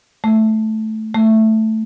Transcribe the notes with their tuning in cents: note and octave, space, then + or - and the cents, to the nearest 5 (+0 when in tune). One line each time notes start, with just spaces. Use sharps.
A3 -10
A3 +0